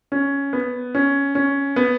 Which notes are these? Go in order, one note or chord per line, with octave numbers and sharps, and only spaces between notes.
C#4
B3
C#4
C#4
B3